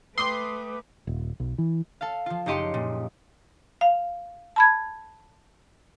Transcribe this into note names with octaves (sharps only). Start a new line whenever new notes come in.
A3 B4 G5 C6 D6 D#6
D#1
B1
E3
A4 F5
F3 F4
F#1 D#4 G4 D#5 C6 C#7
A#2
F5
A5 B5 G#6